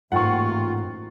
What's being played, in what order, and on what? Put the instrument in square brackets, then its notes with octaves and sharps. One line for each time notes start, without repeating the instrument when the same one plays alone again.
[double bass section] A1 A#3 [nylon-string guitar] G#2 [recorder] F4 [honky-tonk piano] F#5 G5 C#6